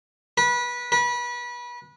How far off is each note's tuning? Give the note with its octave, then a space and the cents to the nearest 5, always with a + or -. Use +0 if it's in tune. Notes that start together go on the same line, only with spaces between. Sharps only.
B4 -25
B4 -30